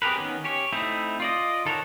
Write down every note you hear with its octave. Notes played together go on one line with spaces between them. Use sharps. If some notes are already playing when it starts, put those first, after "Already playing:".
C4 G4 G#4 A#4 B4
D#3 B3 C#4
C#4 G4 C#5
A3 C4 D#4 E4
F4 D5 D#5
D#3 A4 A#4 C#5 F#5